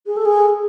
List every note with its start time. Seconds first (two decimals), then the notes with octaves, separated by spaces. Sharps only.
0.06 G#4
0.16 A4
0.25 G#4